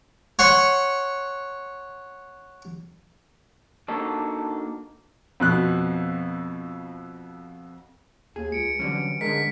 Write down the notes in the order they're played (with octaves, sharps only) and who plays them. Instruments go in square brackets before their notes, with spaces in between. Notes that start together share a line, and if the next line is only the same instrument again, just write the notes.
[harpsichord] C#5 F#5 C6
[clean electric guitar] A#3 D4 D#4 F#4 A4
[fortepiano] F2 B2 F#6
[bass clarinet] D#2 [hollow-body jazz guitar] G#4
[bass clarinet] C#2 [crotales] C#7 D7
[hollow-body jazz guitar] D3 C4 C#4 [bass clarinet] E3 [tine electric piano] F#3 G3
[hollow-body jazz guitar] E2 G#2 D3 [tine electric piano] G#3 A#4 [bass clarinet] D4 [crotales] B6